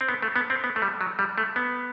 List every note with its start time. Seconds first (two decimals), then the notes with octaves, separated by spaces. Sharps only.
0.01 C4
0.09 B3
0.22 A3
0.36 B3
0.50 C4
0.64 B3
0.76 A3
0.82 G3
1.01 F#3
1.19 G3
1.38 A3
1.56 B3